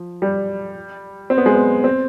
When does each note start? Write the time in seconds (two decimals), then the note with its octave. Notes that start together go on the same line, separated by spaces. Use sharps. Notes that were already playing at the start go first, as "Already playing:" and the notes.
Already playing: F3
0.22 G3
1.30 C4
1.38 B3
1.46 G#3
1.55 B3
1.84 C4